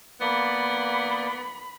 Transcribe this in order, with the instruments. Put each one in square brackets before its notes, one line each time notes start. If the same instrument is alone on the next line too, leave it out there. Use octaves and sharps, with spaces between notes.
[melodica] A#3 D5 [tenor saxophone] B3 [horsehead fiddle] B5